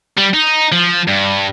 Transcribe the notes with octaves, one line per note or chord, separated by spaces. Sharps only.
G3
D#4
F3
G2